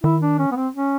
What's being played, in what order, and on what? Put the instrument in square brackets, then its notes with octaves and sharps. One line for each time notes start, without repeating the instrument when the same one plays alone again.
[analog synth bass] D#3 [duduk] E4
[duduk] D4
C#4
B3
C4
C#4